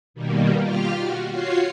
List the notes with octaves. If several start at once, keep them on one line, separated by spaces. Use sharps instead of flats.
B2 D#3 G3 A#3
F4 G4 F6
F#4
F4 F#4 C#5 C7